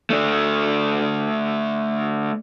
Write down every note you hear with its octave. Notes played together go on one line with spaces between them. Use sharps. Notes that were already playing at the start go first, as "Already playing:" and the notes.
A3 D4